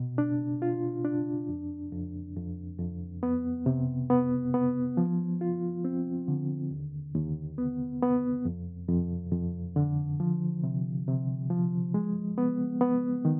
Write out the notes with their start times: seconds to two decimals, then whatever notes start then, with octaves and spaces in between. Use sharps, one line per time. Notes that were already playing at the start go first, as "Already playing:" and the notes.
Already playing: B2
0.18 D4
0.62 F4
1.05 D4
1.49 F2
1.92 F2
2.36 F2
2.79 F2
3.23 B3
3.66 C3
4.10 B3
4.54 B3
4.97 F3
5.41 F4
5.85 C4
6.28 D3
6.71 D#2
7.15 D#2
7.58 B3
8.03 B3
8.45 F2
8.89 F2
9.32 F2
9.76 D3
10.20 F3
10.64 C3
11.08 C3
11.50 F3
11.94 G#3
12.38 B3
12.81 B3
13.25 D#3